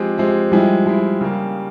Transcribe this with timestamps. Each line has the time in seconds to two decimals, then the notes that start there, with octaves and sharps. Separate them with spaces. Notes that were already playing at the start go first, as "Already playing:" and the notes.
Already playing: F3 G#3 C4 G4
0.18 F3 G#3 C4 G4
0.52 F3 G3 G#3 E4
0.86 F3 G#3 E4
1.21 C#3 G3 A#3